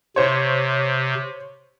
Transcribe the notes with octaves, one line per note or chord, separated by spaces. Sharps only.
C3 C5 C#5